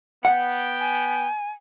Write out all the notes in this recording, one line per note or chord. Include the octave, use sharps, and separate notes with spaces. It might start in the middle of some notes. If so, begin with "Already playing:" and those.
B3 F#5 G5
G#5